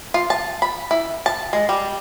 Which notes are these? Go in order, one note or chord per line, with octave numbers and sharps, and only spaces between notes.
F4
A5
B5
E4
A5
G#3
G3